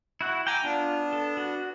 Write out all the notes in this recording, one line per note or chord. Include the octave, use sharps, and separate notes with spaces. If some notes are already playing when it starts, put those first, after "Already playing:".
E4 F#4 F#5
G5 G#5 A#5 D6 E6
B3 D4 F4
A4
F#4